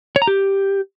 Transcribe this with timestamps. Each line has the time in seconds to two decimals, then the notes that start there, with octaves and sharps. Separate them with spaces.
0.16 C#5
0.22 A#5
0.27 G4